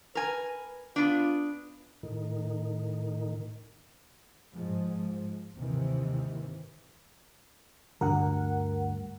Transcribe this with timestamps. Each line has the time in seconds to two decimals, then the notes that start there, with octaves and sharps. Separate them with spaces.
0.15 A#4 B4 G#5
0.96 B3 D4 F4
2.03 A2 D#3
4.53 G#2 F3 G#3
5.55 D#2 G#2 C3 D#3 E3
8.01 D2 G2 D3 A#4 F#5